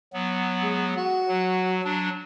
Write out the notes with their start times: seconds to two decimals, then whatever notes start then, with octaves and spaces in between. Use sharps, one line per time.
0.13 F#3 B3
0.63 G#3
0.97 F#4
1.28 F#3
1.84 F#3 D4